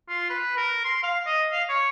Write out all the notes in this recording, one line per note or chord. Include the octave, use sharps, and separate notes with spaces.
F4
B4
A#4
C6
F5
D#5
F5
C#5